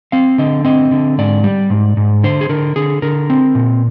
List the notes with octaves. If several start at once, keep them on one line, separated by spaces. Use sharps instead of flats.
C4 F5
D3 D#5
C4 D#5
D3
G#2 D5
G3
G#2
G#2
D3 C5
G#4
D3 A#4
D3 G#4
D3 A#4
C4
A#2